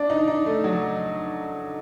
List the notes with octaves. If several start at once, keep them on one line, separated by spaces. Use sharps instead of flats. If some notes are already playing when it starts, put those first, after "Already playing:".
Already playing: D4
D#4
D#4
A3
F#3